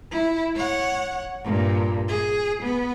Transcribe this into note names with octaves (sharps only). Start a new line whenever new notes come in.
E4
C#5 F#5
G2 A#2
G#4
B3